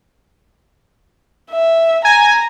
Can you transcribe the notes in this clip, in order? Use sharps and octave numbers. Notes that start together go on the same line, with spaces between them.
E5
G#5 A#5